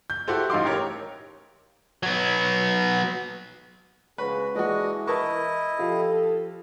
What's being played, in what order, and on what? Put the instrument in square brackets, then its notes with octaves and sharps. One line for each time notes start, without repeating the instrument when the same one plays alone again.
[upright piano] G6
E4 F#4 G4 A4 C5
A1 D#4 F5 C6 D6
G4 A#4 C#5
[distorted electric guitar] F#3 B3
[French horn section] C#3 G#3 G#4 [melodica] F#4 [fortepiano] B4
[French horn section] E3 [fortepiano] G#3 F#4 [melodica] D4 D#5
[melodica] E4 D#5 [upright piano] A#4 B4 [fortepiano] A5 C#6
[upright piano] F3 F4 G4 [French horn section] A4